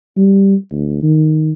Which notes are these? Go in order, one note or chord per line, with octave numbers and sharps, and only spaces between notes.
G3
D2
D#3